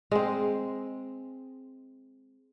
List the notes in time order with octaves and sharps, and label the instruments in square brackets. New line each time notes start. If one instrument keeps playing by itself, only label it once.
[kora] G#3 C4